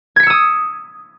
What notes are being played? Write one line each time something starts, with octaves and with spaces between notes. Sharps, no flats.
D#6 E6 G#6 B6 C#7